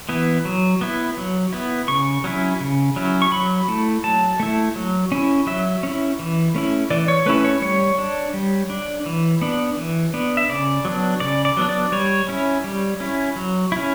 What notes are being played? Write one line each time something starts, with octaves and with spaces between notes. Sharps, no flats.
E3 B3 E4
F#3
B3 E4
F#3
B3 E4
C#3 C#6
F#3 C#4 E4
C#3
F#3 C#4 E4
C#6
F#3 B5
A3 E4
F#3 A5
A3 E4
F#3
C#4 E4
F#3 E5
C#4 E4
E3
A3 C#4 E4
E3 D5
C#5
A3 C#4 E4 B4
C#5
G3 C#5
D4
G3
D4
E3
B3 D4
E3
B3 D4
E5
C#3 D5
F#3 B3 D4
C#3 D5
D5
F#3 B3 D4
D5
G3 C#5
C#4 E4
G3
C#4 E4
F#3
C#4 E4